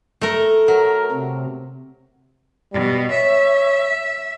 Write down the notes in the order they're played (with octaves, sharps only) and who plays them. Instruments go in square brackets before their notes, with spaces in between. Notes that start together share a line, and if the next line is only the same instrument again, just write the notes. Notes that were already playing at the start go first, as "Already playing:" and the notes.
[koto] A3 A#4 [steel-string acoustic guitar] A4 A#5
[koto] F#3 [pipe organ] A#4
[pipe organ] C3
[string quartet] B2 [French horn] G3
[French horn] C#5 [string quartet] E5